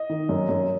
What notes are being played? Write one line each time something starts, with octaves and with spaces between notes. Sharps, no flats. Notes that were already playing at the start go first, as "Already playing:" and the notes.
Already playing: D#5
D#3
F#2
F#2